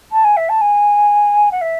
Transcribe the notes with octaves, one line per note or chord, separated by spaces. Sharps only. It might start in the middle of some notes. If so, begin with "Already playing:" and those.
A5
G#5
E5
A5
G#5
F#5
E5